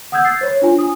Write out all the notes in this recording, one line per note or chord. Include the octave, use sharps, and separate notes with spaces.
F#5 D#6 E6 G6 G#6
A6 C7
C5 C#5
D4 F4 G#5
D#6